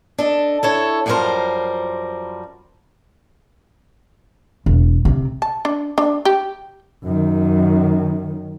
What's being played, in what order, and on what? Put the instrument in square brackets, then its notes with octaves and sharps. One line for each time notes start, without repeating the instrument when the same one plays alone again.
[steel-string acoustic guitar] D4 A4 D#5
E4 A4 C#5
F#2 F3 G3 D#4 A#4 C5
[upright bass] E1
C3
[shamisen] A5
D4
D4
G4
[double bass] F#2 D#3